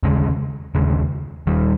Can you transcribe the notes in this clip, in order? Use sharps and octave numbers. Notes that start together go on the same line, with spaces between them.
D#2 C#3 G#3
D#2 C#3 G#3
D#2 D#3 G3